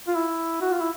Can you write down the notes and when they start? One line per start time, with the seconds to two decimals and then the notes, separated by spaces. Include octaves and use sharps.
0.08 F4
0.16 E4
0.61 F#4
0.71 F4
0.81 E4